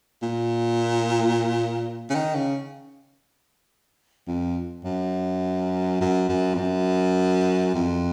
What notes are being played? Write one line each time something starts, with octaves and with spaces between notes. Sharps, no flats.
A#2
C#3
D#3
C#3
F2
F#2
F#2
F#2
F2
F#2
F2